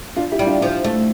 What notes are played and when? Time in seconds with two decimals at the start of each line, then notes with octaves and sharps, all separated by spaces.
0.16 D4 F4
0.32 E4 G4
0.39 G3
0.47 D4 F4
0.61 F3 D4 F4
0.84 A3